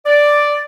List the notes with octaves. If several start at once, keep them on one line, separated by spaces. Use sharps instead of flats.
D5